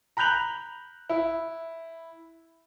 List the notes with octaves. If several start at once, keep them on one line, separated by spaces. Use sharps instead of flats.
A#5 B5 F#6 G6 F7 F#7
E4